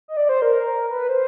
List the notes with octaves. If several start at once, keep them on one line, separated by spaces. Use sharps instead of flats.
D#5
D5
C5
A#4
B4
C5